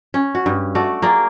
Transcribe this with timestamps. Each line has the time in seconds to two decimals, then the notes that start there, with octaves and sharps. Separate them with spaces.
0.14 C#4
0.35 F#4
0.46 G2
0.75 A3 F#4 D5
1.02 A#3 G#4 D5